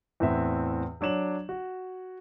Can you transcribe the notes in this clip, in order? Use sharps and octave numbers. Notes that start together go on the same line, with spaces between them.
E2 A2 C4 B4 E5
F#3 D4 C#5 E7 F#7
F#4